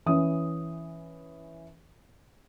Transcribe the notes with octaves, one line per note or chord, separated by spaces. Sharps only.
E3 C#4 D#6